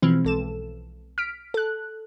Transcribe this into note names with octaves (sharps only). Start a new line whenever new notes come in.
B2 E3 F3 G#3 C4
B1 A4 E7
F6 B6 D7
A4 F#6